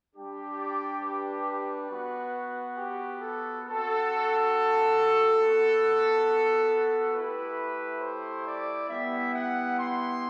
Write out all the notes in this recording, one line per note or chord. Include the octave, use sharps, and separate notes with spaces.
G3 D4 G4
D5
B4
B3 F#4
G4
A4
C4 F#4 A4
B3 F#4
A3 E4 G4 B4
C5
D5
G3 B3 E4 E5
F#5
C6